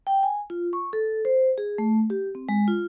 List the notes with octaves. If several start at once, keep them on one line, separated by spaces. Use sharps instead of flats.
G5
G#5
F4
C#6
A4
C5
G#4
A3
G4
C4
G#3
F4